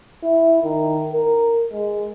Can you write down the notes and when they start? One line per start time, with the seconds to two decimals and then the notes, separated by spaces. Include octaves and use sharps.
0.23 E4
0.63 D#3
1.13 A#4
1.72 G#3